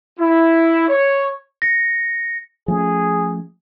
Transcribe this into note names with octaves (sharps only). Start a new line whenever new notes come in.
E4
C#5
A#6 C#7
F3 A3 C#4 G#4